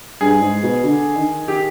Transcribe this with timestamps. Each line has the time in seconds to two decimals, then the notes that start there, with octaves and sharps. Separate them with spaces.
0.21 G2 G#4
0.42 G#2
0.63 B2
0.84 D3
1.16 D#3
1.48 D#3 G4